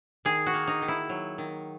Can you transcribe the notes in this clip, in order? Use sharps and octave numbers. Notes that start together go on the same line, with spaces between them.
D#3 G#4
F#4
A#3
D#4
D#3
E4
F#3
D#3